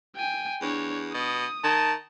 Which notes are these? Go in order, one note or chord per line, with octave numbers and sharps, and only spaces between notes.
G5 G#5
E2 D4 C#5
B2 D#6
D#3 A5